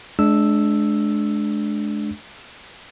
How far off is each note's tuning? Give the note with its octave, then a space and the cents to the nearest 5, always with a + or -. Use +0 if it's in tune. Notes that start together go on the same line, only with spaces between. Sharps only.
G#3 +35 D4 +0 E6 +0